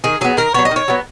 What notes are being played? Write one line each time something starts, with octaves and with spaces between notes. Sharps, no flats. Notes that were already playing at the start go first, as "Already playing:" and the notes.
D#3 G#4
F#3 B3 G#4
D#3 A#4
F#3 B3 C#5
D#5
D#3
C#5
F#3 B3